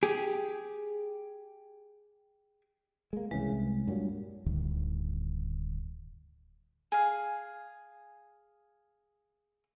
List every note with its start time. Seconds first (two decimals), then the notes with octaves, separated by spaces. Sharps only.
0.03 G4 G#4
3.13 G#3 A#3
3.31 C2 C#3 E3 G#3
3.52 C2
3.87 G2 A#2 F#3
4.46 D1 D2 G2 D#3
6.92 G#4 F5